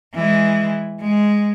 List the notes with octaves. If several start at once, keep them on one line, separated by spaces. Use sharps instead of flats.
E3 G#3
G#3